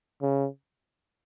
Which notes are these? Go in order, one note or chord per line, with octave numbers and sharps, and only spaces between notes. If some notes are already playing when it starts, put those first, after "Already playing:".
C#3